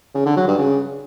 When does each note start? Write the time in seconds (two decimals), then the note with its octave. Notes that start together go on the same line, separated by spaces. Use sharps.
0.15 C#3
0.26 D3
0.36 F#3
0.47 G2
0.58 C#3